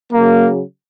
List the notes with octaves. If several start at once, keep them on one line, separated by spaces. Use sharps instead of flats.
C#3 F#3 A#3